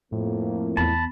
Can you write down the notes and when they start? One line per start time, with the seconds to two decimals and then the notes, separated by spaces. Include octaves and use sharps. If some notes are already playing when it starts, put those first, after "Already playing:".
0.12 F2 A2 A#3
0.77 E2 B3 A5 B5